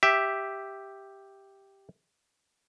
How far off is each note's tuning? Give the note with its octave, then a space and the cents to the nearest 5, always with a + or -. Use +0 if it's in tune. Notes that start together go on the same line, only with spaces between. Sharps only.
G4 +0 E5 +0